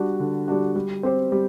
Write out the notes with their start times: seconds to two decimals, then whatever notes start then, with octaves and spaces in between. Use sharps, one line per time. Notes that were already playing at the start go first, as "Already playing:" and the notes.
Already playing: G3 D4 F#4
0.20 D3
0.48 G3 D4 F#4
0.75 G3
1.03 C4 G4 C5
1.32 G3